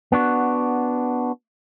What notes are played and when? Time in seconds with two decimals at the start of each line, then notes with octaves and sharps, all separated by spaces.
0.12 B3 D4 F#4